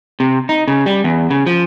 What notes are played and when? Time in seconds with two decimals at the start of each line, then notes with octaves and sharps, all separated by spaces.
0.20 C3
0.49 D#4
0.68 C#3
0.86 G3
1.04 E2
1.30 C#3
1.46 F3